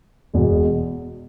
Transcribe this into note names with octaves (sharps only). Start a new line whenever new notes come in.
E1 E2 B2